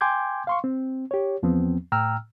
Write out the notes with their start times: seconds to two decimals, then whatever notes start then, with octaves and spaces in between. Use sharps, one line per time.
0.01 G5 G#5 C6 D6 G6 G#6
0.47 F5 C6 C#6
0.64 C4
1.11 G4 C#5
1.43 E2 F3 B3 C4
1.92 A2 G5 A#5 E6 F6